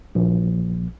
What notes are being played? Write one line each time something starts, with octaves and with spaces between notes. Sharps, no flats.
A#1